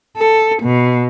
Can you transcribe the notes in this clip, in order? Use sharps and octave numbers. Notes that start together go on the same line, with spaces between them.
A4
B2